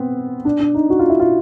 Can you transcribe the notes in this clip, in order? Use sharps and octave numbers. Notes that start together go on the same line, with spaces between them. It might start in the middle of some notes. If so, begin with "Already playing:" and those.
Already playing: B3 C4
D4
D4
D#4
F#4
F4
E4
F4